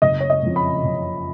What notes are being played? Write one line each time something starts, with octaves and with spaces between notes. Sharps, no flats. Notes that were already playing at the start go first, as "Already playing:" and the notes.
F#1 D#5
C#5
D#5
F2 C#3
B5
F#1